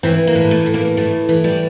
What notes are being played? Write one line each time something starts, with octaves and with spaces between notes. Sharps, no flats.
E3 C4
A#3
A2
A3
E3
A#3
A2 A3
E3
G3